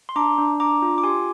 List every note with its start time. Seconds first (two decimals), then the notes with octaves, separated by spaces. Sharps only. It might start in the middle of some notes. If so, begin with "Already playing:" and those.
0.09 C6
0.16 D4 A#5 D6
0.38 D4
0.60 D4 A#5 D6
0.82 F4
0.98 D6
1.03 G4 G#5 C6